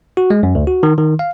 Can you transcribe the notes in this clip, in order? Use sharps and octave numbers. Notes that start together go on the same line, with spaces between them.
F#4
G#3
F#2
D2
F#4
D#3
D#3
F5